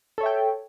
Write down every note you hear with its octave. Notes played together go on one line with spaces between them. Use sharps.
A4 C#5 E5 G5